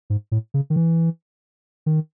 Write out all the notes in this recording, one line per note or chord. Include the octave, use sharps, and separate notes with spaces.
G#2
A2
C#3
D#3
E3
D#3